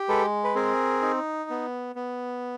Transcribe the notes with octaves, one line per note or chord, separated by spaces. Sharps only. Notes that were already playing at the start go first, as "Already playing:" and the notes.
Already playing: G4
G#3 A4 B4
B4
C4 G#4 A#4
D#4
B3
B3